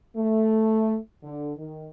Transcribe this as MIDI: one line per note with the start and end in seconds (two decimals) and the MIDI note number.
0.17 0.97 57
1.24 1.52 50
1.57 1.88 51